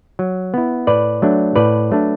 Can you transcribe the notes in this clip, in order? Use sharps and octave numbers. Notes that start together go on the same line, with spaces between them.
F#3
B3 E4
A2 B4 D5
F#3 A3 D4
A2 B4 D5
F#3 A3 D4